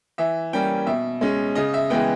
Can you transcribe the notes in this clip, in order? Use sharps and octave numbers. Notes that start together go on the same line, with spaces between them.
E3 E5
G3 A#3 C#4 G5
B2 E5
G#3 C#4
C#3 D#5
E5
E3 G#3 B3 G5